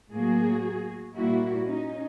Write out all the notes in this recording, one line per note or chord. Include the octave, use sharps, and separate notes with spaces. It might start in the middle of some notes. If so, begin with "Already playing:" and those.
A2 F#3 A#3 F#4 G#4
A#2 G3 A#3 E4 F#4
C#4 D#4